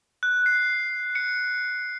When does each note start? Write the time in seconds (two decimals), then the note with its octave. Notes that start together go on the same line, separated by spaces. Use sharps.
0.23 F#6
0.46 C7
1.15 C#7